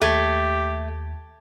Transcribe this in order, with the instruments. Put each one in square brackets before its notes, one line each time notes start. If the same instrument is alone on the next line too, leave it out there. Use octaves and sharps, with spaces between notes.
[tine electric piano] D#2 G#6 [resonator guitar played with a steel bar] A3 [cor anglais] G4